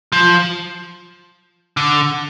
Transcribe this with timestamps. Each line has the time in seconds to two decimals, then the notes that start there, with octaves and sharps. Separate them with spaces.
0.12 F3
1.77 D3